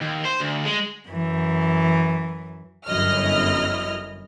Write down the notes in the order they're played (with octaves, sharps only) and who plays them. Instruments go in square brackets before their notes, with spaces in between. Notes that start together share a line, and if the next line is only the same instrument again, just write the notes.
[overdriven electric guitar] D#2
C5
D2
G#3
[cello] F#2 E3
[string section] G1 F#2 E4 D#5 F6